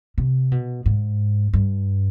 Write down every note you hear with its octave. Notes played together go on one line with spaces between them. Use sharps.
C3
B2
G#2
G2